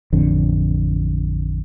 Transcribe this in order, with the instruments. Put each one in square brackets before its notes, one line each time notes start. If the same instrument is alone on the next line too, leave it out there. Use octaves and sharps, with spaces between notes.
[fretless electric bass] A1 F2 D3